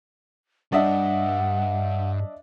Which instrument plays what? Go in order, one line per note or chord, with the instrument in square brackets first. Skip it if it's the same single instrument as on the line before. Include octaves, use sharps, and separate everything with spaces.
[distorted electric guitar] G2 G3 [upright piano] D4 D#5 E5 [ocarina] F#5